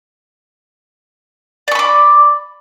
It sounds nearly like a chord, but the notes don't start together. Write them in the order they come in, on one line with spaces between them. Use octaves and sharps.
D5 C#6 B5 D6